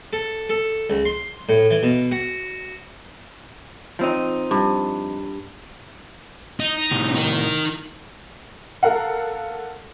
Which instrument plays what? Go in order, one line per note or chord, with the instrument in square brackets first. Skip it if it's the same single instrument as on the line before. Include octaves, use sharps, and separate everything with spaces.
[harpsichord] A4
A4
C#2
C6
A2
E3
B2
F#4
[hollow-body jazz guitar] F3 C4 D#4
[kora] G2
[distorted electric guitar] D#4
[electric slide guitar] A2 C3
[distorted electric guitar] D#4 A#4
[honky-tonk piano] A4 A#4 F5 F#5